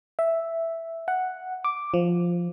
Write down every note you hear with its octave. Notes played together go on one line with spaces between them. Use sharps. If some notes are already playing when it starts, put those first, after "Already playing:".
E5
F#5
D6
F3